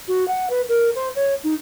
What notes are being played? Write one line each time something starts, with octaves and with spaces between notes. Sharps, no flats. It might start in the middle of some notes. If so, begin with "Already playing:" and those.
F#4
F#5
B4
A#4
C5
C#5
D#4